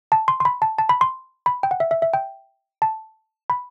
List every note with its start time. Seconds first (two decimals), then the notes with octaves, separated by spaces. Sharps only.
0.12 A5
0.28 C6
0.40 C6
0.45 B5
0.62 A5
0.78 A5
0.89 B5
1.01 C6
1.46 B5
1.63 G5
1.71 F#5
1.80 E5
1.91 E5
2.02 E5
2.14 G5
2.82 A5
3.50 B5